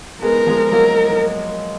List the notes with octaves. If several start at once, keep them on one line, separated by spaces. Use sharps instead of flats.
G#3 B3 A#4
F3 G#3
F#3 A#3 A#4